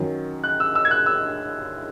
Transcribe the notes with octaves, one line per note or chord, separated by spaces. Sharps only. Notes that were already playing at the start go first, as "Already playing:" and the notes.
Already playing: F#2 D#3 F#3
F#6
E6
E6
G#6
F#6
E6